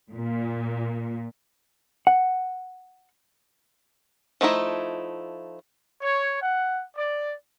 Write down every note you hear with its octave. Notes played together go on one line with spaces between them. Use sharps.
A#2
F#5
F3 A3 D#4 E4
C#5
F#5
D5